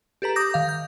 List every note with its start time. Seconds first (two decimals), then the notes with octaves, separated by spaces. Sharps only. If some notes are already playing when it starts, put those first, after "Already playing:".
0.22 G4 A4 B4 A#5
0.36 D6 D#6 G6 A#6
0.54 D#3 F5
0.69 G6